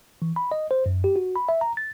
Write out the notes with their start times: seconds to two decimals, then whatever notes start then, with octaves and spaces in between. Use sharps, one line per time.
0.22 E3
0.36 B5
0.52 D#5
0.71 C5
0.86 F#2
1.04 G4
1.16 F#4
1.36 B5
1.49 E5
1.61 A#5
1.77 A6